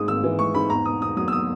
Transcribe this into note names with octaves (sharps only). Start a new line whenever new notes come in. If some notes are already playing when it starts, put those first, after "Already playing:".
Already playing: G#2 G#3 D#6
G#1 E6
E3
G#3 C#6
G#2 B5
E2 A#5
B2 D#6
E2 D#6
F#3 D#6
E6
D#6